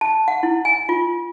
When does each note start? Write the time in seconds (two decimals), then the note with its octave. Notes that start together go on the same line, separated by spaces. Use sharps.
0.01 A5
0.28 F#5
0.43 E4
0.65 G#5
0.89 F4